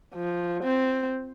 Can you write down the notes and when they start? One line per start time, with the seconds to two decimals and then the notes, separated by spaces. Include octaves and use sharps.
0.14 F3
0.64 C4